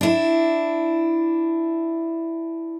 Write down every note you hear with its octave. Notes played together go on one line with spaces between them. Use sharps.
D4 E4